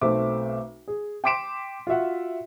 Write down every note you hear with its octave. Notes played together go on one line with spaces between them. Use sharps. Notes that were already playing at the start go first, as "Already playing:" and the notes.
B1 A3 C4 E5 D6
G#4
G5 C6 D6 B6 D7 E7
F4 F#4 E5 F#5